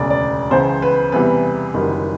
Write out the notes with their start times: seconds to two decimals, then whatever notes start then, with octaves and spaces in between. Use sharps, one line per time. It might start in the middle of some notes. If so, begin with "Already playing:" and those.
Already playing: E1 D2 C#3 D5
0.10 D5
0.51 C#2 C#3 E3 C5
0.82 B4
1.12 E2 C3 E3 G3 B4
1.74 F#1 F#2 D#3 G3